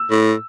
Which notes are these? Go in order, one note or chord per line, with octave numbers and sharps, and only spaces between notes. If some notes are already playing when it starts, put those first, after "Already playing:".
Already playing: E6
A2